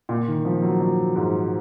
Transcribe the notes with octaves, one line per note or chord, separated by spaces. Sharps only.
A#2
D#3
F3
F#3
F#3
G#2